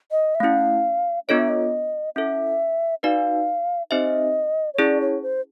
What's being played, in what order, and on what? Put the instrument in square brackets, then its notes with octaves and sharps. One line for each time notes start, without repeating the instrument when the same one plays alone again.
[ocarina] D#5
E5
[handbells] A3 C#4 E4 [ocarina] F5
[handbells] B3 D4 F4 A4 C#5 [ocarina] D#5
[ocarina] E5
D#5
[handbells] C#4 E4 A4 [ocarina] E5
[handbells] D#4 F#4 B4 D5 [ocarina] F5
[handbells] C4 D#4 G4 C5 E5 [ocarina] D#5
[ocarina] C#5
[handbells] C#4 E4 G#4 [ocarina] D5
[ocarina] C#5
C5